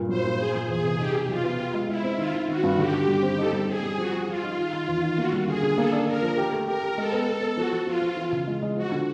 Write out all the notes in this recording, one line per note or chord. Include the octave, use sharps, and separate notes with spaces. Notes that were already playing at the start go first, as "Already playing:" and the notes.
Already playing: G2 A#2 A#3
F#3 C5
A#2
F3 G#4
F3
E2 G#4
C3
D#4 G4
B2
F#3 F4
B3
F4 G4
G#3
G#3 E4
C4
D#3 F4
D#3
D#3 F#4
G2
D3 G4
D3
G3
C4
D#4 A4
G3
C4 G#4
G3
F3 F#4
F3
F3 F4
D#4
D#3 F4
D#3
E2
D#3
A#3 F#4
G3
D3 G#4
D3
A#3 A4
D4
D4 A#4
F3
G4
A3
G4 A#4
G4
G#3 A4
B3
B3
B3
F3 F#4
F3
F3 F4
F3
E3
C#3
G#3
G#3
F3 F#4
D3